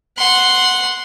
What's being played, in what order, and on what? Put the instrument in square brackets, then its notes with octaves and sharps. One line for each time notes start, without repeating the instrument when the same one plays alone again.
[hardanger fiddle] F#5 C6